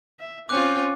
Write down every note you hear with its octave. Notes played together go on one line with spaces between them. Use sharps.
E5
C4 C#4 F4 D6 F#6